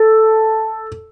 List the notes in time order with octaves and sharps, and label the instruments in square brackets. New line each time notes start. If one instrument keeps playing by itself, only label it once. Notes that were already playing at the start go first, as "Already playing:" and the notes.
Already playing: [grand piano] A4